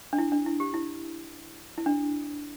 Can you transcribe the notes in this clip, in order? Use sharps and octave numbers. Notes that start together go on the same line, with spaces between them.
D4
E4
D4
E4
G4
E4
E4
D4